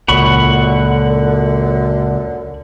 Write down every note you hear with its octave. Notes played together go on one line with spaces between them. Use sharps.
C#2 F#2 A#2 D3 F#5 B5 C#6